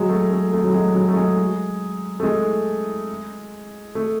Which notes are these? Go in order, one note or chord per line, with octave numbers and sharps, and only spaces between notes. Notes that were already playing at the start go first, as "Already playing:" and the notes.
Already playing: F#3 G#3
A3
A3
A3
F#3
G#3
F#3
A3
G#3
A3
G#3
A3